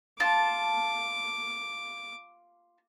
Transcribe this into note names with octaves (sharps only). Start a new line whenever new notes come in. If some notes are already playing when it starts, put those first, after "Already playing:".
F4 A5 D6